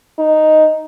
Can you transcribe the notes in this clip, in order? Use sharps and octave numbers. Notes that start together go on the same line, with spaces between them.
D#4